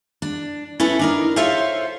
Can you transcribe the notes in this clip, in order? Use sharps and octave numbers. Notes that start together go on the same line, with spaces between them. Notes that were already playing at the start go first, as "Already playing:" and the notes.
D4
C#4 E4 A4 B4
D4 D#4 A#4
F4 A4 C5 C#5 E5 F5